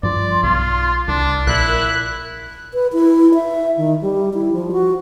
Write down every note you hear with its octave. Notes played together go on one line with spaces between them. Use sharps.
G2 F3 D5 C6
B1 F4
C2 D4
A#1 E4 D5 F#6
A#4
B4
E4
E5
D#3
G3
E4
F3
F#4